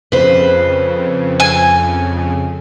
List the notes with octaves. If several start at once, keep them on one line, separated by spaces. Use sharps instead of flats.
F2 C#3 B4 C5
G#5